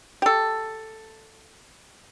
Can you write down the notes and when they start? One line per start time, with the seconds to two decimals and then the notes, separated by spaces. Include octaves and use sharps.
0.22 G4 A4